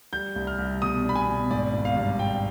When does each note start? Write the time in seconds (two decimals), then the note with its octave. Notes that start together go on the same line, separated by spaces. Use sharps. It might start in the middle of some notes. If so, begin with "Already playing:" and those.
0.13 G3 G6
0.36 C2
0.47 F6
0.59 C2
0.82 B2 D#6
1.05 D4 B5
1.16 G#5
1.27 B2
1.51 G#1 D5
1.74 G#1
1.85 F5
1.96 G2
2.19 G#1 G5